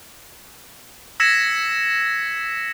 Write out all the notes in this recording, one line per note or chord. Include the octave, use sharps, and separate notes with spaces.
E6 G#6 A#6 B6 C#7 E7